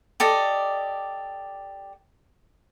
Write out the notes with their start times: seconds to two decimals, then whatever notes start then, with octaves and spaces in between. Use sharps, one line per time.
0.20 G4 A4 D5 D#5